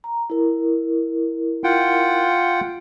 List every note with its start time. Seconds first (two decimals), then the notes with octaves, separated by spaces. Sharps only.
0.04 A#5
0.30 E4 A#4
1.64 F4 F#5 G5